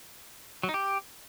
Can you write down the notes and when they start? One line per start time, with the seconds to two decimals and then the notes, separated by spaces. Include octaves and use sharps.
0.63 F#3
0.69 D#4
0.74 G4